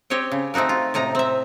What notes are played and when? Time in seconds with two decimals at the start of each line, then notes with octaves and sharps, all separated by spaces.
0.10 C4 G4 C#5 D#5 G5
0.32 C#3
0.54 A3 C4 D#4 F#4 A#4
0.69 F4
0.94 A2 C3 D#4 A#5
1.15 C4 E5